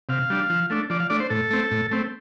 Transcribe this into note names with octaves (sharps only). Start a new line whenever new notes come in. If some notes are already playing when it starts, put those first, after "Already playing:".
C3 F5
G3 D4
F3
A3 D4
F3 D5
F5
A3 D4 D5
C5
A2 A4
A3 C4
A2
A3 C4